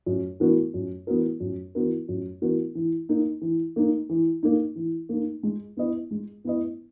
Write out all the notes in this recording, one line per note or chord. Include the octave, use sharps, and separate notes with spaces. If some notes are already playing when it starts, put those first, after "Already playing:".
F#2
E3 B3 F#4 A#4
F#2
E3 B3 F#4 A#4
F#2
E3 B3 F#4 A#4
F#2
E3 B3 F#4 A#4
E3
A#3 D#4
E3
A#3 D#4
E3
A#3 D#4
E3
A#3 D#4
G#3
B3 E4 B4 D#5
G#3
B3 E4 B4 D#5